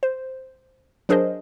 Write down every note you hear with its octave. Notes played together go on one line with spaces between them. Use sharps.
C5
F#3 D4 G#4 A#4 C5 D#5